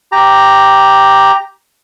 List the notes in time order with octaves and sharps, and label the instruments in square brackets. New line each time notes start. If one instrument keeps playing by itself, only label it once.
[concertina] G4 A#5